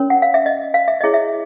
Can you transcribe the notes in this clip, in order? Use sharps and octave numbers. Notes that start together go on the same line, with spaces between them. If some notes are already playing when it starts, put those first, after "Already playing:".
Already playing: C#4 F#4 A#4 C#5
F#5
F5
E5
D#5
F5
E5
E4 G#4 C#5 D#5
E5